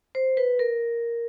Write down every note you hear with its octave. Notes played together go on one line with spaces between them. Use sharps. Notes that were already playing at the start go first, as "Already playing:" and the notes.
C5
B4
A#4